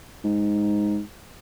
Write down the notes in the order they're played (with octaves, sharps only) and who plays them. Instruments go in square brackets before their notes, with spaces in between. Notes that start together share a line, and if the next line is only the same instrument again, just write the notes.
[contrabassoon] G#2